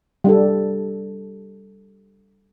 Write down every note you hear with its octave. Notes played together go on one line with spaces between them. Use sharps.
G3 D4 A4